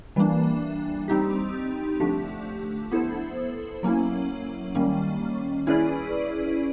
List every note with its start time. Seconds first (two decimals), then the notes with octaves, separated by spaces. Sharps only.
0.16 E3 G3 A#3 D4
1.08 G3 C4 D#4 G4
2.00 D3 F3 A3 D4 G4
2.92 B3 E4 A4 C5
3.83 F#3 A#3 C#4 E4
4.75 D#3 G3 A#3 C#4
5.67 C#4 E4 G#4 B4 D5